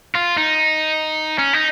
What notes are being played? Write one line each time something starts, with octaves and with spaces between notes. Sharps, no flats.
F4
D#4
C#4
D#4